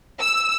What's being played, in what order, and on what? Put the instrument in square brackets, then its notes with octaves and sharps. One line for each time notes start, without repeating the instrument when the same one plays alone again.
[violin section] E6